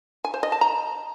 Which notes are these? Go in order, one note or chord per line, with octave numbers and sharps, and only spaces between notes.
G#5
C5
D#5
A5
A#5